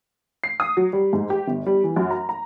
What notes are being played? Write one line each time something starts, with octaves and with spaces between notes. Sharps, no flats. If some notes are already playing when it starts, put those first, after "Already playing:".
C7
D#6
F#3
G3
G#2
G4
G1
G3
E3
F#2
A#5
A#5